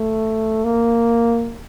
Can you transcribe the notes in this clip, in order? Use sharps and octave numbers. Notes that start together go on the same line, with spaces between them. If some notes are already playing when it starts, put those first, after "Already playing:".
Already playing: A3
A#3